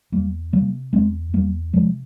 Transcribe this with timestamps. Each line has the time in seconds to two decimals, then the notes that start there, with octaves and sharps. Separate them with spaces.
0.12 E2 G3 A#3
0.53 C3 G3 A#3
0.93 E2 G#3 C4
1.33 E2 G3 A#3
1.73 C3 F3 G#3